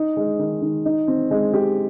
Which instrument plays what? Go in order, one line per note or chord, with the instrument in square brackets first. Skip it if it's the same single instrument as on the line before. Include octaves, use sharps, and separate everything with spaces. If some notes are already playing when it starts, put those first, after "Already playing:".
Already playing: [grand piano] D#4
G#3
D#3
D#3
D#4
C4
G#3
G4